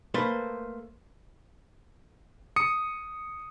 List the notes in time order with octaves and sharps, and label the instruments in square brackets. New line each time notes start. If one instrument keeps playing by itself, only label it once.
[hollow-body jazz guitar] A3 A#3 B4 C5
[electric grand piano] D#6 C#7